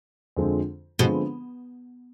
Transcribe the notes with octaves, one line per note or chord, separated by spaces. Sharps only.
F2 D3 F3 G#3 C4
B2 D3 F3 G#3 C4